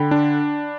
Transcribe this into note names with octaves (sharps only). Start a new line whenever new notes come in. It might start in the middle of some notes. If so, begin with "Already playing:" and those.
Already playing: D3 G5 B5
D4